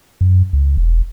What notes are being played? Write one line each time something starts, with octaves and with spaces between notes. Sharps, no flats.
F#2
C#2
E1